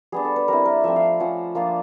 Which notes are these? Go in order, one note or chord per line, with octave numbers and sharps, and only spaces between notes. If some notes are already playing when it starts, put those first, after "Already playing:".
G3 B3 D4 G#4
A4
B4
G3 C4 E4 A#4
A#4
F3 A3 C4 E5
F5
F3 A3 C#4 F#5
F3 A#3 D4 F4 F5